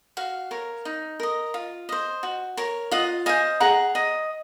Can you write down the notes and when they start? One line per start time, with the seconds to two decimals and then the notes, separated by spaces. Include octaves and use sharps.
0.17 F#4 F5
0.51 A#4 C#5
0.85 D#4
1.20 A#4 D#5
1.54 F4
1.89 C5 D#5
2.23 F#4
2.57 A#4 C#5
2.91 F4 D#5 F#5
3.26 C5 D#5 F5 G#5
3.60 G#4 F#5 A#5
3.95 D#5